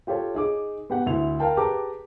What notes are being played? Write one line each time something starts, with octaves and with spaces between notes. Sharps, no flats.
F4 G4 A4 C#5
D#4 G#4 D6
B3 G4 F#5
D2 E4 F7
A#4 F5 G5 A5
G4 G#4 B4 A5 A#5 D6